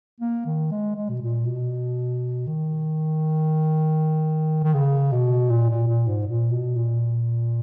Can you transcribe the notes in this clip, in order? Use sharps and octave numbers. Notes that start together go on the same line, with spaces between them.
A#3
D#3
G#3
G#3
B2
A#2
B2
D#3
D#3
C#3
B2
A#2
A#2
A#2
G#2
A#2
B2
A#2